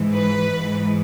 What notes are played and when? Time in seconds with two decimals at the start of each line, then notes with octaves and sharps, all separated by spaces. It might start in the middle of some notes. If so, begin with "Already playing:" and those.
Already playing: G#2 E3
0.13 B4
0.51 G#2 E3